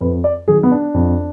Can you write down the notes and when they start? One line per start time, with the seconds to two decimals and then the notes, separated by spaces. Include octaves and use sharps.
0.01 F2 B4
0.24 D5
0.48 D#3 F#3 G#4
0.63 B3
0.72 D4
0.94 F2